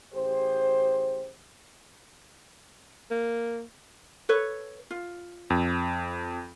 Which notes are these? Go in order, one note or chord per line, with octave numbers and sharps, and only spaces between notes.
A1 G4 G#4 C5
A#3
A4 B4 C#5
F4
F2